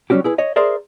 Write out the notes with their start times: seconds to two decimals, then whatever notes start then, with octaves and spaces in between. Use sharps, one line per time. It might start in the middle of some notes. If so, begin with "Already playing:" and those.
0.10 F#3 G3 C#4 F#4 G4
0.24 E4 G#4 B4
0.38 C#5 D#5
0.56 G#4 A#4 C5 D5 E5